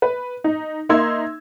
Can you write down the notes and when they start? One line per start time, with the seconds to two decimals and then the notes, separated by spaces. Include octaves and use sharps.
0.02 B4
0.44 D#4
0.89 A#3 D#4 E5 C6 E6 G#6